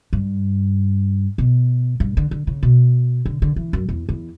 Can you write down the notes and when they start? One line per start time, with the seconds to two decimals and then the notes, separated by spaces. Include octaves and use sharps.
0.13 G2
1.38 B2
2.00 G2
2.17 D3
2.31 D3
2.47 C#3
2.63 B2
3.26 D3
3.42 D3
3.56 E3
3.73 F#2
3.89 E2
4.09 E2